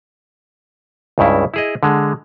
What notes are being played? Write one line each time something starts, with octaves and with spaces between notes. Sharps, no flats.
C#2 G2 C#3 E4
E4 G#4 D#5
D3 G#3